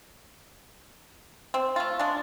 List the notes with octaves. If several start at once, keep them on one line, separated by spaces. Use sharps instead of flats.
C4
A3 F4
G#3 D4